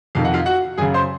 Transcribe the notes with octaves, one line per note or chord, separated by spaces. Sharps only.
F2 C3 D#3 F5
F#5
F4 F5
F#4 F#5
F#2 C#3 G#4 G#5
C5 C6